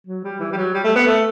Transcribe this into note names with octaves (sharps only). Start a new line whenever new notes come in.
F#3
G3
E3
G3
F#3
G3
A3
B3
A3